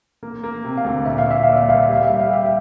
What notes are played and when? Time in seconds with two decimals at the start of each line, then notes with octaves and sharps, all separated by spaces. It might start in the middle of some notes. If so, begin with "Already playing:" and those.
0.23 A#3
0.43 A#3
0.65 C3
0.78 F5
0.85 D2
1.05 A#2 E5
1.18 F5
1.27 A#2 E5
1.43 A#2 F5
1.56 E5
1.68 C2 F5
1.83 E5
1.89 G4
1.94 F5
2.07 G3 E5
2.20 F5
2.29 G4 E5